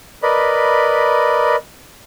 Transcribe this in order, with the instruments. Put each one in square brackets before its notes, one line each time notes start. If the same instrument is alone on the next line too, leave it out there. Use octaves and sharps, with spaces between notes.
[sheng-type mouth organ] A#4 B4 D5 D#5 B5